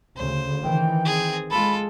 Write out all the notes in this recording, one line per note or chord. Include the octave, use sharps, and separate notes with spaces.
D2 C#3 C5
D#3 E3 G5
C4 G#4
G#3 F4 A4 B5